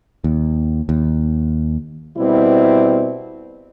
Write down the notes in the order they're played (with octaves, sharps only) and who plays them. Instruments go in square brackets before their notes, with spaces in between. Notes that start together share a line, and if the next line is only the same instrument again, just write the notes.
[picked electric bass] D#2
D#2
[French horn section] B2 G3 C4 E4